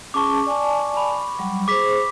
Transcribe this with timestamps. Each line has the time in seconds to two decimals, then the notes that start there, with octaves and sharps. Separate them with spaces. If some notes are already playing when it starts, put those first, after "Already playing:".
0.14 C#4 G#4 A5 C#6 D6
0.46 D5 G#5 A5
0.97 B5
1.39 F#3 G3
1.68 G#4 C5 D6 B6